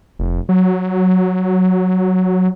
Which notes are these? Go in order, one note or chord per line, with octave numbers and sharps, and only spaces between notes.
F1
F#3